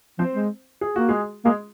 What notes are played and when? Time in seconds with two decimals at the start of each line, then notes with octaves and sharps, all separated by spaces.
0.19 F3 C4 C5
0.34 G#3
0.81 G#4
0.96 A#3 F#4
1.09 G#3 G#4
1.45 G#3 A#3 G#4